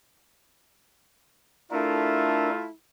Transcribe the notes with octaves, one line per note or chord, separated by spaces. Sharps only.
A3 D4 E4 F4 A4 A#4